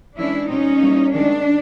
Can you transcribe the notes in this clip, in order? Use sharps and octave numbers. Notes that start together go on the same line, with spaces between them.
E3 G#3 C#4 D4 E4
A#2 G3 C4 C#4 D#4
E3 G3 A#3
D#3 G#3 C#4 D4